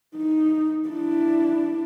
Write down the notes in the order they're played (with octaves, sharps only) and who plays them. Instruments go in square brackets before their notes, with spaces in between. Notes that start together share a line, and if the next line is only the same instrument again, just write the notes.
[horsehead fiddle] D#4
D4 E4